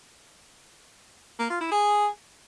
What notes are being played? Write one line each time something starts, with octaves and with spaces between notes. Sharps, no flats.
A#3
F4
E4
G#4